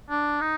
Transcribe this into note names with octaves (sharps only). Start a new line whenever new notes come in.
D4
D#4